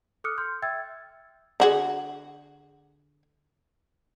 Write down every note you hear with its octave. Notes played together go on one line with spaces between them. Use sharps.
A4 D6 D#6 F6 F#6 C#7
C6 F6 G6
E5 G5 E6 G#6 A6
D3 F#4 G#4